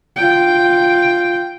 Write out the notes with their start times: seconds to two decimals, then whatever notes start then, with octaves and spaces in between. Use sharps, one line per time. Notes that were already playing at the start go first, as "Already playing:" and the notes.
0.16 F4 G5